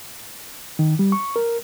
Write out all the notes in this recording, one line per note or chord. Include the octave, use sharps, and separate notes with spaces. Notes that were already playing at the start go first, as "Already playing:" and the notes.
D#3
G3
C#6
A#4